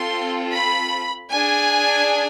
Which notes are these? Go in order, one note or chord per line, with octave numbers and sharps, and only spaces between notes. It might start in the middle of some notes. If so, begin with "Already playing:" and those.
Already playing: C4 F4 A4 C6
B5
D4 G#4 G#5